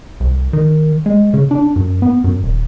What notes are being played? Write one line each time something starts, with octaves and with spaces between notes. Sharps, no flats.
C2
D#3
G#3
C#3
D4
F#2
B3
F#2
D#1